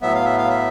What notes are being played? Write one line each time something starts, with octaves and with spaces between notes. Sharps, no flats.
A2 F#3 B3 E5
F5
E5
F5
E5